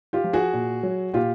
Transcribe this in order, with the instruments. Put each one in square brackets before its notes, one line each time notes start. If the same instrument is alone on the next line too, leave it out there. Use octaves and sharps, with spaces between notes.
[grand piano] F4 G4
F3
F#4 G#4
A#2
F#3
A#2 F4 G4